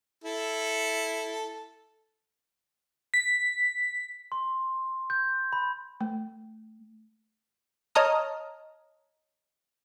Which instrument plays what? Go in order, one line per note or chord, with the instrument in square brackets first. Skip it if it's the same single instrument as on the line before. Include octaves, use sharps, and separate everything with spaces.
[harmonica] E4 A4
[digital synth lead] B6
[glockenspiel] C6
G6
B5
[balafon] A3
[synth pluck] C#5 D#5 A5 A#5 D#6 F6